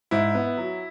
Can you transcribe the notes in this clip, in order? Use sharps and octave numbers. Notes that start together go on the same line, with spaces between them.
G#2 E4
B3
F#3